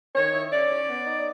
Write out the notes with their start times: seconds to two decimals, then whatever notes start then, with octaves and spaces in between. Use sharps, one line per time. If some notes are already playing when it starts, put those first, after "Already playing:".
0.16 D#3 C#5
0.34 E4
0.51 C#4 D5
0.69 C#4
0.88 B3
1.06 D#4